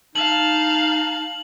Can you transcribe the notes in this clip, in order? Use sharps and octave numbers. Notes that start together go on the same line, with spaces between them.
D#4 F5 A5 F#7